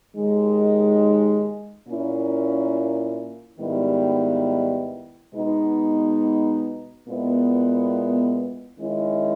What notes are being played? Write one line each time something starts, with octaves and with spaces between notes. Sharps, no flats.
D#2 D#3 G#3 D#4
A#2 A#3 C#4 E4
G#2 D#3 G3 B3 E4
B2 G#3 B3 D#4
A#2 G#3 B3 E4
D#3 G#3 C#4 E4